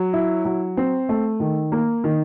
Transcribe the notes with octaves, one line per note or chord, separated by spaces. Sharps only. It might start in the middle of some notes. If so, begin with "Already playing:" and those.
Already playing: F#3
E4
F#3
C4
A3
D#3
A#3
D#3